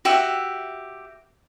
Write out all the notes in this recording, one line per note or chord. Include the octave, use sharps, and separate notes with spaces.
F#4 G4 E5